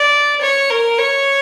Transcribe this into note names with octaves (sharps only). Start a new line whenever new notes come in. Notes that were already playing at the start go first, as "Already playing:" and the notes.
Already playing: D5
C#5
A#4
C#5